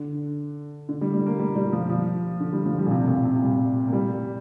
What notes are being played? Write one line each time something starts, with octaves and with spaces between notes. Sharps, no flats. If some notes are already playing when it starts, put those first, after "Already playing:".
Already playing: D3
D3
G3
G3
A#3
G3
G3
F3
F3
D3
G3
F3
G3
A#2
C3
A#2
C3
G3
A#3
G3